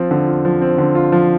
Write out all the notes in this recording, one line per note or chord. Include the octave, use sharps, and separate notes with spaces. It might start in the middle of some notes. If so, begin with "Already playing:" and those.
Already playing: F3 C4 F4
D3
F4
F3
C4
D3
F4
F3